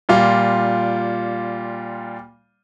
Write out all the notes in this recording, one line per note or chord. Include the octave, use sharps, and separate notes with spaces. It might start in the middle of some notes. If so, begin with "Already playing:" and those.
A#2 G3 F4